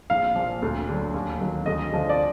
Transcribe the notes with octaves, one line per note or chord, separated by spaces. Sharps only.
A#1 F5
A#2 F3
D2
D3 F#3
D#2
D#3 F#3
D2 D#5
D3 F3
D5